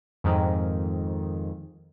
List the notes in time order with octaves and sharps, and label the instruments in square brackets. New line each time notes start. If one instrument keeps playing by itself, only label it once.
[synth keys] F2 G#2 D#3